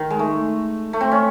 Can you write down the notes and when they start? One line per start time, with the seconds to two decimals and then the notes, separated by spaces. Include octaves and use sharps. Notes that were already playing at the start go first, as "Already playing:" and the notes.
Already playing: D#3
0.10 G#3
0.19 A3
0.93 A3
1.01 C4
1.12 C#4